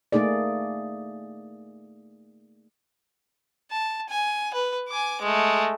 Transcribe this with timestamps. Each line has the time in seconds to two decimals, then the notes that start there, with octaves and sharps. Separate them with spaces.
0.12 A3 A#3 D#4 G#4 D5
3.71 A5
4.09 G#5
4.54 B4
4.88 G#5 D6
5.22 G#3 A3